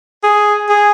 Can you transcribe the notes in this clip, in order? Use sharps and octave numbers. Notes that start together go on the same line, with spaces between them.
G#4
G#4